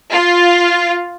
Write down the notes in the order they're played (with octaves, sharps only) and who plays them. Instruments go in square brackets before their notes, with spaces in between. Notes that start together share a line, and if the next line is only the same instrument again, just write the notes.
[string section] F4